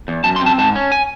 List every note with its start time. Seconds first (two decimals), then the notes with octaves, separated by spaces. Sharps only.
0.08 E2
0.24 F#2 A5
0.36 C6
0.41 C4
0.46 A5
0.58 G#2 A5
0.75 C#4
0.92 G#5